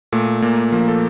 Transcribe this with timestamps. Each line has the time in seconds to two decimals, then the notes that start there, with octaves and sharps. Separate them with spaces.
0.12 A#2 A3
0.42 A#2 A#3
0.72 F3 A#3
0.88 A4